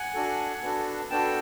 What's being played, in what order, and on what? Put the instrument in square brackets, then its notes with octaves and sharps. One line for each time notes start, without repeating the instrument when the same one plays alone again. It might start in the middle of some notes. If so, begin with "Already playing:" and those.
Already playing: [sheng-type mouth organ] F#5 G#5
D4 F#4 A4
B3 D4 F#4 A4
B3 D4 F#4 A4 G5 A5